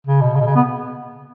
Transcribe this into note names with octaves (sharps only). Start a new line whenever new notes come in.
C#3
B2
C#3
B2
C#3
B3